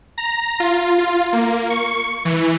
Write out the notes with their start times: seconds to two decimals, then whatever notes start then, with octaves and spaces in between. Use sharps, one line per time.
0.18 A#5
0.60 F4
0.98 F4
1.33 A#3
1.70 C#6
2.25 E3